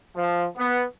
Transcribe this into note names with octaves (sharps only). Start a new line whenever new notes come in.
F3
B3